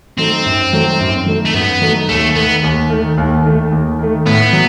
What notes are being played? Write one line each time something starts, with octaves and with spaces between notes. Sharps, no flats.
F#3 A3 C4 D#4
F#2
F#3 A3 D#4
F#2
F#3 A3 D#4
A3
F#2 B3
F#3 A3 D#4
D#2 A3
D#3 A3 B3
D#2
D#3 A3
D#2
D#3 A3
D#2
D#3 A3
A2 B3
F#3